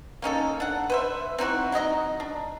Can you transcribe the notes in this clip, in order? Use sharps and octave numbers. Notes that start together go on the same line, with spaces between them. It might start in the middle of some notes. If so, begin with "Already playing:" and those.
A#3 C#4 D#4 A4
D4 F#5
B4 C5 E5
C4 D#4 E4 F#4
F#3 D#4 D#5 A#5
D4